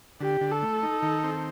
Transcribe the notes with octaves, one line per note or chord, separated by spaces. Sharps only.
D3 G4
D3
A4
A3
D#4
D#3
C4